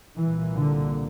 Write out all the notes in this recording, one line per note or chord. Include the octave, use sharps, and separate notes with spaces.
C2 A#2 E3
D3